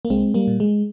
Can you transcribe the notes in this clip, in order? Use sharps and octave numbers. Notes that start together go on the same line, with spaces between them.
A#3
C2 G#3 C4
G3 A#3
A#2
G#3